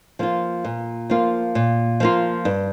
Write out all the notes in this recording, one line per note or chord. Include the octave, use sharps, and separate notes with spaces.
F3 A#3 F4
A#2
F3 A#3 F4
A#2
F3 A#3 F4
G2